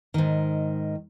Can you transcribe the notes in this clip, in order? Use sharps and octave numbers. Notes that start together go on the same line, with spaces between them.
G#2 D#3